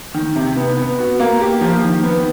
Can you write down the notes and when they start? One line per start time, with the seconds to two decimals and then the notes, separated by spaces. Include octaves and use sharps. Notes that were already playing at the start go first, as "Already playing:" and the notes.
0.14 D#3
0.36 C3
0.56 B3
0.77 B3
0.99 F#4
1.20 A#3
1.40 G4
1.61 F3
1.82 D#3
2.04 B3